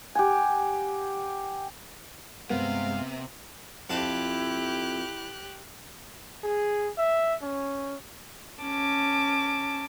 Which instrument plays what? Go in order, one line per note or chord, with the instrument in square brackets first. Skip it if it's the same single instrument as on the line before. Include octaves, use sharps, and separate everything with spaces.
[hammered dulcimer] G4 F#5 G#5
[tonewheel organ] G2 G#3 [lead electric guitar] C3 [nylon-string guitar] B3 [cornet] F5
[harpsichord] F2 F5 A5 [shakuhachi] E4 [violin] G4 F#6
[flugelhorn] G#4
E5
C#4
[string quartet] C#4 A5 D6